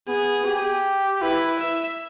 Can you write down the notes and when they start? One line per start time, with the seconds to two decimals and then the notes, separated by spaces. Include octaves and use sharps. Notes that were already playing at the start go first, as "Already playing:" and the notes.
0.08 B3 G#4
0.46 G4
1.22 E4 B4
1.60 E5